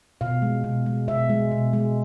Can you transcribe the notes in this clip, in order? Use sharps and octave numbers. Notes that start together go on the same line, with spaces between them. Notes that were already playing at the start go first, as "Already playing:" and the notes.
B2 F5
G#3
B2
G#3
B2 E5
G#3
B2
G#3